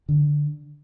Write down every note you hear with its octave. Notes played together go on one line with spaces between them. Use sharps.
D3